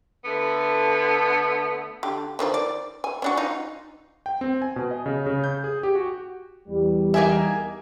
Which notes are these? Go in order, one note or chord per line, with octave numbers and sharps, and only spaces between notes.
D3 A3 B3
D3 G4
D3 D#3 F3
D5
G#5
C#4 D4 F#4
D#4 F4
G5
C4
G#5
B2
D#5
C#3
C#3
G6
G#4
G4
F#4
E2 G3
A#3 D#4 G#4 E5 G5 G#5